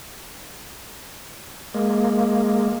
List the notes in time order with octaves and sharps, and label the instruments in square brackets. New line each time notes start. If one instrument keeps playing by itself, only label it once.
[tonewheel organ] G#3 A#3